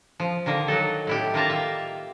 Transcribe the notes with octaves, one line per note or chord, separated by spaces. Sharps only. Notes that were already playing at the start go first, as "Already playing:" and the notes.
F3
D3 D#3 A#3
F#3 D#4 A4
A2 E4 G4
D#3 A#3 F4 A5 A#5
F4 E5